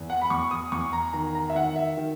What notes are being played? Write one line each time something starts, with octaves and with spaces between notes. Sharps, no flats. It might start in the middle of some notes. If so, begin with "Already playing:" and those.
Already playing: E2
F#5
B5
E2 C#6
D#6
E2 C#6
A#5
D#3 A#5
A#5
E5
D#3 F#5
E5
D#3